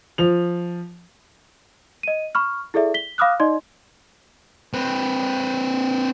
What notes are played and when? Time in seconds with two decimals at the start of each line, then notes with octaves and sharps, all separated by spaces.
0.18 F3 F7
2.03 D#5 D#7
2.35 B5 C#6 F6
2.74 E4 G#4 A4 D5 E5
2.94 B6 G7
3.18 F5 B5 D6 D#6 F6 F#6
3.40 D#4 D5 D#5 C6
4.74 C4 B4